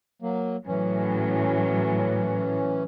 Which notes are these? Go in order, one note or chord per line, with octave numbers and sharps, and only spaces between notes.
F#3 A#3
A2 E3 F#3 C#4